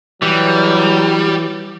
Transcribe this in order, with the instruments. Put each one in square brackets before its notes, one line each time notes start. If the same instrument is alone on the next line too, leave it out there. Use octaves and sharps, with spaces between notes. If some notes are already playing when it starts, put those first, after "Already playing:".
[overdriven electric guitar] E3 [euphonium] F#3 [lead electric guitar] G3